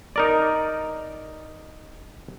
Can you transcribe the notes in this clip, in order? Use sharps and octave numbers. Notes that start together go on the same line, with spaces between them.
D#4 A#4 D5